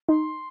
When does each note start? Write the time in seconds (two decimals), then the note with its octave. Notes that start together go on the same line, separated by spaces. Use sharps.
0.08 D#4 C6